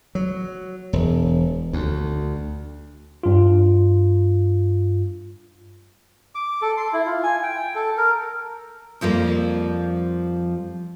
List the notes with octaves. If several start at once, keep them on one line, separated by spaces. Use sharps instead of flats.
F#3
E1
D2
G2 F4
D6
A4
C6
E4
F4
G#5
G5
A4
A#4
F2 F3 G3 A#3